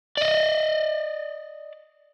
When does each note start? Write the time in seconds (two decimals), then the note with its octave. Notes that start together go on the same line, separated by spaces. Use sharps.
0.17 D5 D#5